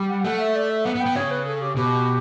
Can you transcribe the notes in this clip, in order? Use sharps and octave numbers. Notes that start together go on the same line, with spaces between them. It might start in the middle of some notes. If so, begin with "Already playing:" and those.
Already playing: G3
F#5
A3 F#5
E5
D5
E5
B3 F#5
B3
G5
B3
C#3 C#5
B4
A4
G4
B2 G4